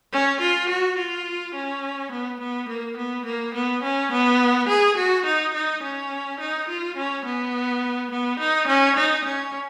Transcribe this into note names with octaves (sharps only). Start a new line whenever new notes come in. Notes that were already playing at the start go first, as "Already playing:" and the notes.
C#4
F4
F#4
F4
C#4
B3
B3
A#3
B3
A#3
B3
C#4
B3
G#4
F#4
D#4
D#4
C#4
D#4
F4
C#4
B3
B3
D#4
C#4
D#4
C#4